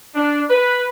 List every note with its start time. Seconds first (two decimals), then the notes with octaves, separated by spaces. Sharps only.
0.15 D4
0.50 B4